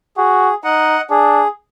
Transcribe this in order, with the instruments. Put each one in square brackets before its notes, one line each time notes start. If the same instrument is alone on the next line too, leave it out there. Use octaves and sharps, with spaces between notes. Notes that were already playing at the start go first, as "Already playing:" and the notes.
[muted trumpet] F#4 [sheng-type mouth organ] G#4
[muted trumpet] D#4 [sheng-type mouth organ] D#5 F#5
[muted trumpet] D4 [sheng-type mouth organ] G#4